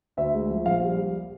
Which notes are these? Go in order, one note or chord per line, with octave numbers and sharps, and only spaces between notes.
D2 E5
G#3
F3
A#1 F5
G3